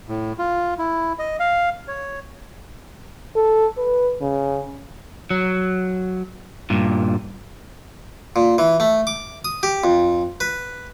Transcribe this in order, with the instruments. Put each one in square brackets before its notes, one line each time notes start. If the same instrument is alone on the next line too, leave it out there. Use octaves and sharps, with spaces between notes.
[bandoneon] A2
F4
E4
D#5
F5
C#5
[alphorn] A4
B4
C#3
[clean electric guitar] F#3
G2 A#2
[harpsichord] A#2
E3
A3
D6
D#6
G4
F2
B4